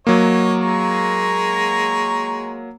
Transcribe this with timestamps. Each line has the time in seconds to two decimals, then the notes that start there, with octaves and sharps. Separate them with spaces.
0.07 F#3 A#3 C#5 D#5
0.61 G#3 A#5 C#6